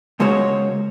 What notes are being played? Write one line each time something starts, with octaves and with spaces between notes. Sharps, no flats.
C#3 G#3 A#3 F#4 C5 C#5